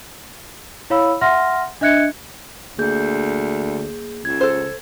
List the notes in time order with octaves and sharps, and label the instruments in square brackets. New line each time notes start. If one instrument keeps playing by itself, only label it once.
[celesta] E4 C#5 F5 B5 E6
E5 F#5 C6 F6 A#6
D4 D#5 E5 F#6 G#6 C#7
[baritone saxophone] D2 [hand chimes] A#3 G#4 G6
[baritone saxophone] C#2 [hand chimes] G#6
[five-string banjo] A4 C5